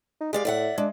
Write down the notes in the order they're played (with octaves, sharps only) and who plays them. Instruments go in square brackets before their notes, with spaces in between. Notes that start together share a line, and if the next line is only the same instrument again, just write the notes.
[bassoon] D#4
[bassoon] G#3 [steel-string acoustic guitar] G4 D5 F5
[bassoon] A2 [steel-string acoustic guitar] D5 E5 F#5
[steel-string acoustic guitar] G#3 [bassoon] D4